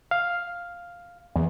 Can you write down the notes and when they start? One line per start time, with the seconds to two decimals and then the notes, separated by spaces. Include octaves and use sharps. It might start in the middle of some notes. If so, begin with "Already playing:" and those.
0.11 F5
1.36 E2